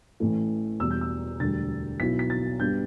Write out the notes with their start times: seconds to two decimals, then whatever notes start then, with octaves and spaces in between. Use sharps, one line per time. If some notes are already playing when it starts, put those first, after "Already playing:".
0.20 A1 A2 E3 A3 E4
0.80 E2 B2 G3 E6
0.91 G6
1.01 E6
1.40 E1 D2 D3 G3 A6
1.99 B1 B2 B3 E4 B6
2.19 B6
2.30 A6
2.59 G2 G3 B3 G6